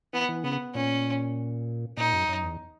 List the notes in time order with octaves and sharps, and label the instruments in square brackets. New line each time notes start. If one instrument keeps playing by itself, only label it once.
[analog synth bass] E3 [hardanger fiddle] B3
[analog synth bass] E3
[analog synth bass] C#3 [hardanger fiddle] B3
[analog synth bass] A#2 [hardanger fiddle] C#4
[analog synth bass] A#2 [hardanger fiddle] D#4
[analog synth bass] F#2
F#2
E2